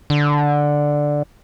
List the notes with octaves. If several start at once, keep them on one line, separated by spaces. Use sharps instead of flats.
D3